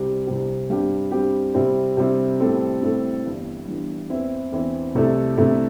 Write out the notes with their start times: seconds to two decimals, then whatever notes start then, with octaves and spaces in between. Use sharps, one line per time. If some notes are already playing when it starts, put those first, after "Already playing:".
Already playing: C2 C3 G3 C4 G4
0.27 C2 C3 G3 C4 G4
0.70 G2 G3 C4 G4
1.12 G2 G3 C4 G4
1.54 C3 G3 C4 E4
1.97 C3 G3 C4 E4
2.40 A2 G3 C4 A4
2.82 A2 G3 C4 A4
3.24 G1 G2 E3
3.67 G1 G2 E3
4.10 E2 E3 C4 E4
4.52 E2 E3 C4 E4
4.95 C2 C3 A3 E4 A4
5.37 C2 C3 A3 E4 A4